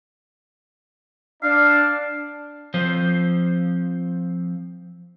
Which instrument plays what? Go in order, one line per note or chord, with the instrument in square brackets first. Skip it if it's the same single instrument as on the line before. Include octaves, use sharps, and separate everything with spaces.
[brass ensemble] D4 [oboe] F5
[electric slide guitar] F3 C4 C5